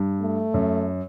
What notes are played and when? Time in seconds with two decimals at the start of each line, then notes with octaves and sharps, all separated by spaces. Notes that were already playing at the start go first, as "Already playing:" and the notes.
Already playing: G2
0.21 A3
0.54 F#2